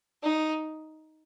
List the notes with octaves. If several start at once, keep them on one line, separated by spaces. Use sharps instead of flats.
D#4